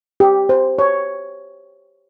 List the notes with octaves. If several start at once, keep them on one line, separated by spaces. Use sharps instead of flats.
G4
C5
C#5